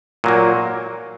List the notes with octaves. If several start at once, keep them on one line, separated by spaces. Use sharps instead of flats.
A#2 F#3 A#3